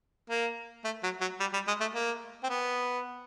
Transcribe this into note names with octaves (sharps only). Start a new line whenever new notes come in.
A#3
A3
F#3
F#3
G3
G3
G#3
A3
A#3
C4
B3